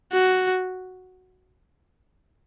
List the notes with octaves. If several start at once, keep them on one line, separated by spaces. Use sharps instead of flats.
F#4